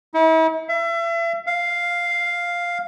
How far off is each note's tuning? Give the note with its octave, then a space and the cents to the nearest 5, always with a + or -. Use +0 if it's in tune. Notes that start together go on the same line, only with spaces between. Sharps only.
E4 -40
E5 +35
F5 +0